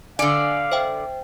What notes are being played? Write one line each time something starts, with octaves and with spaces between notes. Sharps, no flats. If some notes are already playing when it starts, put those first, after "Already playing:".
D3 D5 F5 G#5
C5 E5 G5